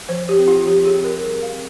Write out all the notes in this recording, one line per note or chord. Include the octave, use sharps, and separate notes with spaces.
F3 C5
G4
C4
F4
F3 G4
G#4
C4
A#4
G3 G#4
F5
C4